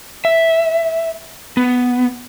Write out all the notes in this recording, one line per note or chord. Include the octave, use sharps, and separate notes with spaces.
E5
B3